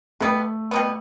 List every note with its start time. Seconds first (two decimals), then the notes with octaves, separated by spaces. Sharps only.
0.20 B2 G3 A3 B3
0.71 B2 G3 B3